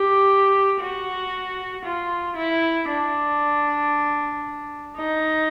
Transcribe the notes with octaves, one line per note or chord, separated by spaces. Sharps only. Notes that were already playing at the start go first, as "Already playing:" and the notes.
Already playing: G4
F#4
F4
E4
D4
D#4